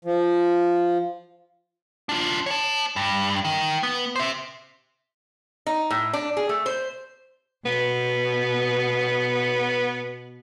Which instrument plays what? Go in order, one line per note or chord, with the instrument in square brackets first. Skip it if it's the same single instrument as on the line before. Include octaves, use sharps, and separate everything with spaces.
[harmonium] F3
[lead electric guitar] D4 F4
C#5 A5
G2
D#3
B3
C5 E5
[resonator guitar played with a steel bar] D#4
A2
D4
G#4
A3
C5
[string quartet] B2 [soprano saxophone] B3